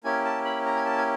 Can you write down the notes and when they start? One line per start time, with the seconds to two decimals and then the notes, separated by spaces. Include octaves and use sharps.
0.04 A#3 C#4 E4 G4 G#5
0.25 A5
0.45 B5
0.66 A#5
0.76 G#5
0.85 A5
0.98 G#5